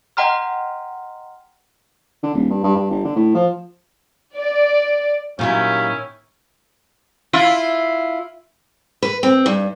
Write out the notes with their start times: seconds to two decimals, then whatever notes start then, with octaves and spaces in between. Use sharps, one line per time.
0.17 D#5 F#5 G5 A#5 C6 F6
2.23 D3
2.34 D#1
2.50 G2
2.64 G2
2.76 G2
2.91 G1
3.04 D3
3.16 A2
3.35 F3
4.37 D5
5.39 A#2 D#3 F#3 C#4 E4 G4
7.33 E4 F4
9.03 B4
9.23 C4
9.46 G2